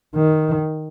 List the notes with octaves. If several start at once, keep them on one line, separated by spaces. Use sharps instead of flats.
D#3